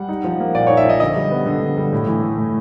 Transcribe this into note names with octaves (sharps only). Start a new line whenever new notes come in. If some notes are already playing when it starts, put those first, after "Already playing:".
Already playing: G3 F#5
D#4
F3
A#3
A#2 D5
D#4 C#5
E5
F3 D#5
D3 D#5
G3
B3
D3
D3
G3
A2
E3
A3
A2